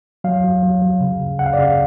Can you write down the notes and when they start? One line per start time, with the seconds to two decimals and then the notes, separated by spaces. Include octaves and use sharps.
0.24 F#3 F5
0.44 F#3
0.63 F#3
0.82 F#3
1.01 C#3
1.20 C#3
1.39 C#3 F#5
1.46 F5
1.53 D5
1.58 C#3 F5